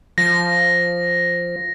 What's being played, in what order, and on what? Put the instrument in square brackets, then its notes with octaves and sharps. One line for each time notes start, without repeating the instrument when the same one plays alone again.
[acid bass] F3 [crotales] A#6